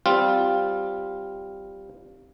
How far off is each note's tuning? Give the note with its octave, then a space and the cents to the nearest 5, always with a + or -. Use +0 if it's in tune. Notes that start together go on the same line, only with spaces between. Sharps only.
G3 +0 C4 +0 F4 +0